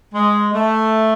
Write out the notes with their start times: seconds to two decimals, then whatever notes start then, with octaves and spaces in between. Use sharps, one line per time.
0.14 G#3
0.53 A3